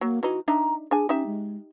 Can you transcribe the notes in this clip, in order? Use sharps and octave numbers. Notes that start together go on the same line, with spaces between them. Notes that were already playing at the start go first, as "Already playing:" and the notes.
F#3 A#3
E3 D#4 F#4
D4 D#4 E5 A#5
D4 G#4 G#5
C#4 D#4 G4 E5
G#3